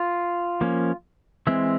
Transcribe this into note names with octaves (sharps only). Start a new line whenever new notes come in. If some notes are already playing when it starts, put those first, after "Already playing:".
Already playing: F4
F3 A#3 C#4
E3 G#3 C4 E5